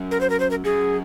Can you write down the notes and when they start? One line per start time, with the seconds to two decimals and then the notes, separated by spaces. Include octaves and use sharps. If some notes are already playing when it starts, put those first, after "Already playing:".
Already playing: F#2
0.11 A#4
0.21 C5
0.30 A#4
0.40 C5
0.51 A#4
0.64 F#2 G#4